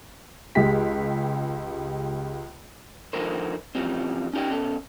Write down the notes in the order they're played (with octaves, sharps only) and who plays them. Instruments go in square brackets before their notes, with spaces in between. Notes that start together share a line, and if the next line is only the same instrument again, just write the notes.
[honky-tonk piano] C#2 G#3 G4 B6
[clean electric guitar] D3 D#3 F3 A#4 C5
C#3 E3 F3 G3 C4
C#4 D#4 G4 D5 G5
B2 C#4 A4